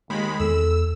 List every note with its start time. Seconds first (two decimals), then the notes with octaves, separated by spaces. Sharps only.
0.10 D#2 D#3 G#3 B5
0.40 E2 A4 E6